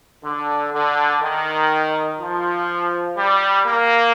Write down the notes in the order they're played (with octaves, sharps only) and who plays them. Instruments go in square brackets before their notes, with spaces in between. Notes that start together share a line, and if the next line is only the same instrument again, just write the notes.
[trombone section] D3
D3
D#3
F3
G3
A#3